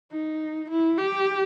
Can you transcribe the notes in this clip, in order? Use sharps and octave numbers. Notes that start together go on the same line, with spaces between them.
D#4
E4
G4